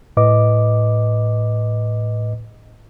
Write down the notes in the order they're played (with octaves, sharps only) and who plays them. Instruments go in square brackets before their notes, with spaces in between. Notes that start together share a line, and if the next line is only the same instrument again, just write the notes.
[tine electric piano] A2 B4 D#5 D6